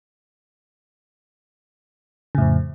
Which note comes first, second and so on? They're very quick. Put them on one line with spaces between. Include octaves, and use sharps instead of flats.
C#3 A2 F2